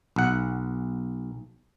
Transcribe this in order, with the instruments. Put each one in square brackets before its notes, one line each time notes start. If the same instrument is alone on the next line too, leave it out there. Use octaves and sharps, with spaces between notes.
[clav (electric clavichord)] B1 F#5